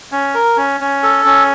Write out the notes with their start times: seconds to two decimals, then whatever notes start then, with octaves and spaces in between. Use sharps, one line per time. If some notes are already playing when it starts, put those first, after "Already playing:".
0.12 C#4
0.34 A#4
0.57 C#4
0.80 C#4
1.03 A4
1.26 C#4